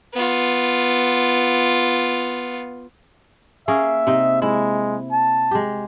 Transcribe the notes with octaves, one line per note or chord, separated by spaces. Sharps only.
B3 F4
A#3 C#4 G#4 E5
C3 D#4
G#3 E4
A5
G#3 G4